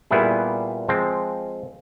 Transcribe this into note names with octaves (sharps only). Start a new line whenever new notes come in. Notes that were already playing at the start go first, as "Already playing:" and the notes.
A#2 G3 B3 E4 G#4
F3 G#3 C4